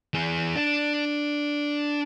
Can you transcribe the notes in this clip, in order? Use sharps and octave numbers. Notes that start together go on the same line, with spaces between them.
E3 G#4
D4